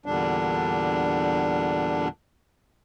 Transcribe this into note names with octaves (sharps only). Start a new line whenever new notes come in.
E2 A#2 D3 G3 D4